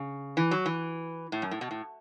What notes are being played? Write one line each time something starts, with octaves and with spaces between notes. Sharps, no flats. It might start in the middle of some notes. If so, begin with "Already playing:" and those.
Already playing: C#3
E3
F#3
E3
A2
F#2
A2
B2
A2